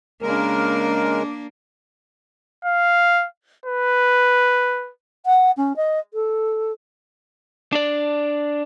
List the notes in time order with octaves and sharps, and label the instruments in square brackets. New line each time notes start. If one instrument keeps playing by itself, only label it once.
[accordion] C#3 G#3 A#4 [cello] A#3 D4
[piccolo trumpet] F5
B4
[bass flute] F#5
C#4
D#5
A4
[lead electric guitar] D4 D5